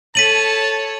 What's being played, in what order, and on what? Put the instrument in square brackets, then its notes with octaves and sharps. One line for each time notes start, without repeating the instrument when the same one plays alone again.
[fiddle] A4 C#5 [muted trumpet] A5 [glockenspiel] B6 D#7 F#7